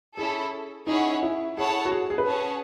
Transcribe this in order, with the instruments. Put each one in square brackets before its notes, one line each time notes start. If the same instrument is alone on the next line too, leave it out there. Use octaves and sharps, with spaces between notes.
[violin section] C#4 E4 A4 [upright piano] G#4
[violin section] C#4 E4 G#4 C#5 F#5 [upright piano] D#4
[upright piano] E4
[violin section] E4 A4 C#5 F#5 A5 [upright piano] G#4
[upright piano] F#4
G#4
G#4
B4
[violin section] C#4 G#4 C#5 F#5 A5